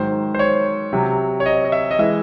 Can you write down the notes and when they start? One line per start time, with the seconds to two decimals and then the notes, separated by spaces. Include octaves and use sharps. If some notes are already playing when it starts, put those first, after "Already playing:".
Already playing: G#2 D#3 F#3 C5
0.35 C5
0.39 C#5
0.93 C3 F#3
1.40 C#5
1.46 D#5
1.65 D#5
1.72 E5
1.91 D#5
1.99 E3 G#3 E5